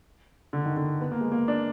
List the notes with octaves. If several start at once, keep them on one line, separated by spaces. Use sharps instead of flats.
D3
D#3
D3
B3
A#3
G#3
A#3
D4